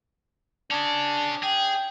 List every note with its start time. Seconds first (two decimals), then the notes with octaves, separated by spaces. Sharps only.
0.71 C#4 D4 G#4
1.43 G#4 G5